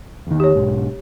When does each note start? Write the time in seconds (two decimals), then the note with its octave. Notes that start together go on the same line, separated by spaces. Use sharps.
0.27 E2 D#3
0.40 G4 C#5
0.55 B1 G#2